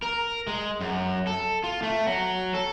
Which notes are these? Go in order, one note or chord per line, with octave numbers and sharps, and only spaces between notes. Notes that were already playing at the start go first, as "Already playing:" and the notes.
A#4
G#3
F#2
A4
F4
A3
F#3
A4